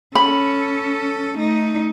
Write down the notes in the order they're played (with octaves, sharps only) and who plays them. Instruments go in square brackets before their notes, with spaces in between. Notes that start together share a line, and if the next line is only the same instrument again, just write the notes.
[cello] C#4 A4 [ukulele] B5
[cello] A3 D#4